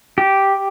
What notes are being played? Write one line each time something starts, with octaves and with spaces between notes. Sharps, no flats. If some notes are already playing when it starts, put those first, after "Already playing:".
G4